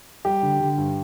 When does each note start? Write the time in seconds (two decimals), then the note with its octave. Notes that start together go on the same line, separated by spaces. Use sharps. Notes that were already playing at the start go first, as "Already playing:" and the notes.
0.25 G3 G4
0.43 D3
0.60 D3
0.78 G2